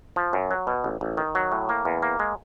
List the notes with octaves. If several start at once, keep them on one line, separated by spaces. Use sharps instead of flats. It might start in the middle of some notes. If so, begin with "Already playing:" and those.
F3
F#2
F#3
B2
A1
A1
D#3
F#3
A2
A#3
E2
A#3
G#3